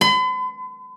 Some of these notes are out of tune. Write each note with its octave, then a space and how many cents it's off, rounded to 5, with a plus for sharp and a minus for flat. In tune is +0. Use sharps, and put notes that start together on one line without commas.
B5 +45